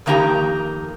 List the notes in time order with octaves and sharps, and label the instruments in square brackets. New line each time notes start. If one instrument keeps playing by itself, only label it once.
[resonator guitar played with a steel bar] F2 D#3 A#3 D#4 G4 A#5